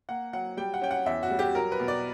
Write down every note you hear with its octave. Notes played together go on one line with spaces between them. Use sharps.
A#3 F#5
F#3 F#5
G3 G5
F#5
C#4 G5
F#5
E2 E5
F#4
G3
G4
F#3 A#4
B4
B2
D5